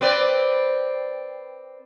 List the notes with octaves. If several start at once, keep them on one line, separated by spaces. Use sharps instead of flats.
C4 B4 D5